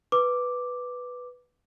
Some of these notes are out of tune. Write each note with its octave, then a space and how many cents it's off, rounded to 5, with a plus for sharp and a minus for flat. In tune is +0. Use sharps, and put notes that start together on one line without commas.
B4 +0 D6 +0